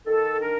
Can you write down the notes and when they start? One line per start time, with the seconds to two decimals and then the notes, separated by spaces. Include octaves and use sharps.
0.07 D#3 A4
0.40 D4 A#4